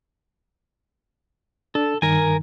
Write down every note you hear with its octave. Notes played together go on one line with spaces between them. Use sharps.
D4 A4
G2 D#3 A#4 G#5